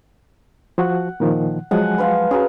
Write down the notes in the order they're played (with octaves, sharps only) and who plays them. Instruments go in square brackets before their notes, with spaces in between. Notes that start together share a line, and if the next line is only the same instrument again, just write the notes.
[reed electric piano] F3 F#4 [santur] F#5
[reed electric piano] A#2 D#3 F3
[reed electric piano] F3 F#3 G#3 [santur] F#5 G#5 A5
[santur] B4 C5 F5
[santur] F#3 B3 G#4 [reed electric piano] C#4